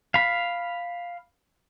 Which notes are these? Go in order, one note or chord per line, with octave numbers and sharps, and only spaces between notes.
F5 B5